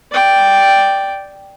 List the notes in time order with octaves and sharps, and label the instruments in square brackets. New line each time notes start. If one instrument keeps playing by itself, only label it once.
[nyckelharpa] D5 G5